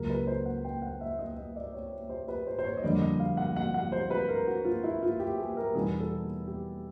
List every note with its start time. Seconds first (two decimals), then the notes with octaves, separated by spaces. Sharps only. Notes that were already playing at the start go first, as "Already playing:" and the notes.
Already playing: C#2 C#3 F#3 A#3 A#4
0.10 B4
0.27 C5
0.45 F#5
0.65 G5
0.82 F#5
1.01 E5
1.19 D#5
1.37 D#5
1.56 D5
1.74 C#5
2.10 C5
2.28 B4
2.47 C5
2.59 C5
2.64 C#5
2.77 D#5
2.84 F2 D3 G3 A#3 D5
3.01 D#5
3.20 F5
3.37 F#5
3.56 F#5
3.74 F#5
3.92 C5
4.10 B4
4.29 A#4
4.47 F#4
4.65 F4
4.84 E4
5.02 F4
5.20 G4
5.38 G#4
5.57 A#4
5.75 E2 B2 G3 B3 D#4 G#4
6.00 A4
6.47 G4